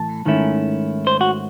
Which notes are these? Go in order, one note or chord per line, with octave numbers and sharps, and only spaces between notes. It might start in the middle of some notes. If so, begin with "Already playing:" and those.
Already playing: A2 E3 A5
G#2 D#3 A3 C#4 E4
C5
F#4